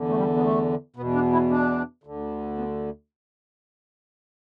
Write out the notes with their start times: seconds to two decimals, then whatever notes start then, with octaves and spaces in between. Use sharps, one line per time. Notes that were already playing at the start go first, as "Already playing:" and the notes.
Already playing: E2 D3
0.08 A3
0.16 G3
0.36 B3
0.43 A3
0.96 B2 B3
0.99 E2
1.14 D4
1.32 E4
1.50 D4
2.04 D2 D3
2.58 B3